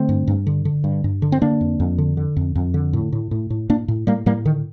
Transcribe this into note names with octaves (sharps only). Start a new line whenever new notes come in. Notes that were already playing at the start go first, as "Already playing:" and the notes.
Already playing: D3 A3 C4
G2
G2
D3
D3
G2
G2
D3
C4
D3 A#3 D4
F2
F2
D3
D3
F2
F2
D3
A2
A2
A2
A2
A2 A#3 D4
A2
A2 G3 A#3
A2 G3 A#3
D3 D#3